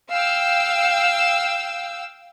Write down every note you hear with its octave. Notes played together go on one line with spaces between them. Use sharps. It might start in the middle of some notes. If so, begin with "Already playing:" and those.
F5 G5 E6